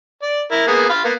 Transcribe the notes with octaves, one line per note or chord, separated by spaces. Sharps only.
D5
E4 A#4
A#3 B3 G#4
F4 F5 B5
A#3 B3